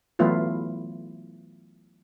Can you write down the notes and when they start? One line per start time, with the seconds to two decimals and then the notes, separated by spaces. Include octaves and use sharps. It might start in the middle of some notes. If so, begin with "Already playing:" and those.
0.19 E3 F#3 A3 B3 E4 F4